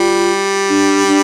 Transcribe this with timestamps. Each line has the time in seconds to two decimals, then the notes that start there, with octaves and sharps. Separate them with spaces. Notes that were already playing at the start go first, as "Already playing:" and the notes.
Already playing: G3 F4
0.69 D4
1.08 D4